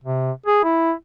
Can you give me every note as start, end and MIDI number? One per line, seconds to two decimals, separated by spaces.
0.04 0.31 48
0.46 0.62 68
0.64 0.92 64